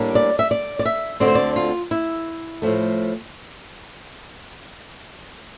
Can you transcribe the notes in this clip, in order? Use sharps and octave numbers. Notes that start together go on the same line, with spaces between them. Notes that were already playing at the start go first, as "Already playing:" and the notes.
Already playing: A2 G3 A#3 D4
D5
E5
D5
D5
E5
D2 D3 A3 C4 D5
C5
D5
F4
E4
A2 F3 A3